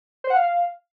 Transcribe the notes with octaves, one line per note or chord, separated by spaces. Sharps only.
C5
F#5
F5